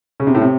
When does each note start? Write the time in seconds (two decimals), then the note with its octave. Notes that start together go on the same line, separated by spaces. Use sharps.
0.20 C#3
0.27 C3
0.34 A2
0.41 C3